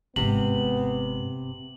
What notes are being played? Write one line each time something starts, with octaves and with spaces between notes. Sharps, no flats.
G#1 G#2 C3 B3 F#7